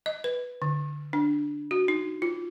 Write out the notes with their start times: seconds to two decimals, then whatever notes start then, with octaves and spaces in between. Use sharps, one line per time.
0.06 D#5
0.24 B4
0.62 D3
1.13 D4
1.71 F#4
1.88 D#4
2.22 F4